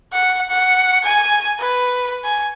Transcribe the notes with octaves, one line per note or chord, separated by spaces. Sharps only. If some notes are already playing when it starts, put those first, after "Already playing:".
F#5
F#5
G#5
B4
G#5